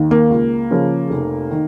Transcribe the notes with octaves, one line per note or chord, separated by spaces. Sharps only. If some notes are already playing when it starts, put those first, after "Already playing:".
Already playing: D#2 D#3
A#3
C#2
C#3 F3 C#4 A#4
F1
D#3